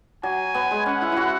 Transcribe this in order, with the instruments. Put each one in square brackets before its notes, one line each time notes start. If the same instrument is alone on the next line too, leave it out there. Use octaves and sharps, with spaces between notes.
[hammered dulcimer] F#3 [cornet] G#5
[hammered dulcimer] B3
G#3
[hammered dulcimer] C#4 [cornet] F#5
[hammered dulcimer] E4
E4 F#4